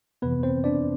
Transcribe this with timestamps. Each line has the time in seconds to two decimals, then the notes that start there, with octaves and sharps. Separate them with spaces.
0.22 F2 C3 E3 B3 B4
0.43 C4 C5
0.64 D4 D5